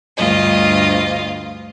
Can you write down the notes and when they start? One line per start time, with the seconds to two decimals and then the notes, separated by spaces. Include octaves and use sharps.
0.17 D2 G2 F4 D#5